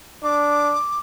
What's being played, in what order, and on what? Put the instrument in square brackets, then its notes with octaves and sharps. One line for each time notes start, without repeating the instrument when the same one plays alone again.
[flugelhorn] D4 [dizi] D6